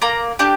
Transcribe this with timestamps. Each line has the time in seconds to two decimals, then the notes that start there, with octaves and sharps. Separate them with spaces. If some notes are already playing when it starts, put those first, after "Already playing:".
0.02 A#3 A#5
0.39 D4 G4